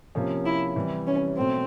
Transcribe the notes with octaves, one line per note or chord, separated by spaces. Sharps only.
C3 F3 A#3 C#4
E4
C3 E3 G3
C#4
B2 F#3 A3 C4